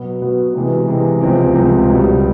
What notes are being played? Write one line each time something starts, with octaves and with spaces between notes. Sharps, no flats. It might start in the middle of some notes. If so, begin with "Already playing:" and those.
Already playing: B2 F#3 B3
B2 F#3 B3
C3 E3 G#3
C3 E3 G#3
C#2 C3 F3 G#3 C4
C#2 C3 F3 G#3 C4
C#2 B2 G3